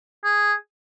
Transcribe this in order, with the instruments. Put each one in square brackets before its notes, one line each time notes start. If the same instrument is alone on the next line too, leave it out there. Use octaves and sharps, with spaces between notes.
[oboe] G#4